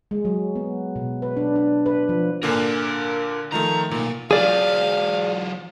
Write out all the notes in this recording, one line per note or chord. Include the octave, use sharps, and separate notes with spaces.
G#3
F#3
B3
B2
B4
D4
D4
B4
F3
A#2 D3 A#3 A#4 G#5
D#3 F3 A3 A#5
B1 A#2 D#4
F#3 F4 G#4 D5 F5